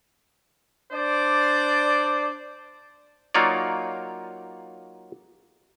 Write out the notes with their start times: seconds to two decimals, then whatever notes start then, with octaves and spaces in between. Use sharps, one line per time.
0.92 D4 C5 D5
3.34 F#3 A#3 D#4 F4 C#5 D5